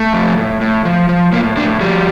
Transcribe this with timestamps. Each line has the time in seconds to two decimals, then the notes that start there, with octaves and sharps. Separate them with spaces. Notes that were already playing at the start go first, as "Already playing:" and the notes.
Already playing: A3
0.13 F3
0.38 A2
0.61 A2
0.85 F3
1.09 F3
1.32 A2 A#3
1.57 A2 D4
1.81 F3 G3